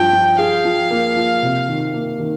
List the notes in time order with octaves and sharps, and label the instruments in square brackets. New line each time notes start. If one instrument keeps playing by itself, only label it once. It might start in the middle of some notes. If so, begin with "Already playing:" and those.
Already playing: [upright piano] G2 F3 [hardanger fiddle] G5
[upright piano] F3
[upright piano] G#4 [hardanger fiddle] F5
[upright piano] F3
A#3
F3
C3
D#3
A#3
D#3